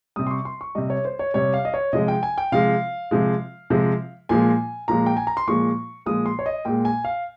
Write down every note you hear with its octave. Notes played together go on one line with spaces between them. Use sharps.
C3 G3 D#6
C6
C#6
C6
C#6
C3 G3 D#5
C#5
C5
C#5
C3 G3 C#5
F5
D#5
C#5
C3 F3 G#3 D#5
G5
G#5
G5
C3 F3 G#3 F5
C3 F3 G#3
C3 F3 G#3
A#2 F3 G#3 G#5
A#2 F3 G#3 A#5
G5
G#5
A#5
C6
A#2 F3 G#3 C#6
A#2 F3 G#3 D#6
C6
C#5
D#5
A#2 G#3 G5
G#5
F5